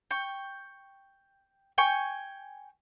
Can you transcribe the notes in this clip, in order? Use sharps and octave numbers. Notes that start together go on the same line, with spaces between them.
G5 C#6
G5 G#5 C#6